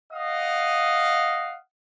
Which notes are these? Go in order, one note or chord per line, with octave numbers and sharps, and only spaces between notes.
D#5 F5 F#5 D#6